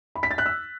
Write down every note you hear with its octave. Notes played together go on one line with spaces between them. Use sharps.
B5
B6
A6
F#6
E6